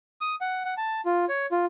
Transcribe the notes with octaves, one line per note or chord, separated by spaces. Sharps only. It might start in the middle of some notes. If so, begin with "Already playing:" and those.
D#6
F#5
F#5
A5
F4
C#5
F4